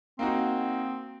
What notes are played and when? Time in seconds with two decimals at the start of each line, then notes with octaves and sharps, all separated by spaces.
0.19 A#3 C4 D#4 F#4